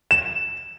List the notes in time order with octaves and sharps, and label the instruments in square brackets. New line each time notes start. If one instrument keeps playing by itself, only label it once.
[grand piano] E7